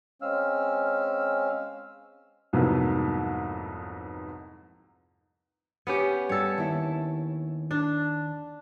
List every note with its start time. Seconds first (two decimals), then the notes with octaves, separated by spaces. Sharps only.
0.22 G#3 C4 C#4 F5 E6 F6
2.53 C2 F2 G#2 F#3 A#3 B3
5.87 B3 C#4 G4
6.29 G2 A4 C#5
6.58 D#2 E4
7.71 D4